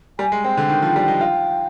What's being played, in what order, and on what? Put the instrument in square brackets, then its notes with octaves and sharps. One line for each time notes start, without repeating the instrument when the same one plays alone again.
[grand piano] G3 [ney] G#5
[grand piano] G#3
[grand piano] C4 [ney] G5
[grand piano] D3
D#3
F3
G3
D#4
F4